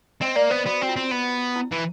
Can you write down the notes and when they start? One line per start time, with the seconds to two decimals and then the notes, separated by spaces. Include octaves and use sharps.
0.21 C4 D#5
0.36 A#3 D5
0.50 B3 C5
0.66 B3 F#4
0.81 C4 F#4
0.89 F4
0.96 C4
1.11 B3
1.56 E4
1.72 E3